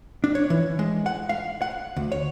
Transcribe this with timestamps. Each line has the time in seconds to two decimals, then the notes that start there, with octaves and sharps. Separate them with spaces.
0.24 D4
0.35 C#5
0.50 E3
0.79 G#3
1.06 F#5
1.29 F5
1.62 F#5
1.96 D2
2.12 C#5